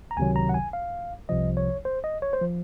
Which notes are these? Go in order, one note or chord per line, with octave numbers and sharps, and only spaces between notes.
A#5
C#2 C3 D#3 F#3 G#5
A#5
F#5
G#5
F5
C2 C3 F3 D#5
C#5
C5
D#5
C#5
C5
F3